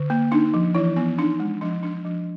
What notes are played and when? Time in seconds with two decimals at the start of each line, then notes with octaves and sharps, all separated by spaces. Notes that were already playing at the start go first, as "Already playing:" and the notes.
Already playing: D3
0.10 A#3
0.32 D4 D#4
0.54 F3
0.75 E3 E4
0.96 B3
1.18 D4 D#4
1.40 G#3
1.61 F3 D4
1.83 D4
2.05 F3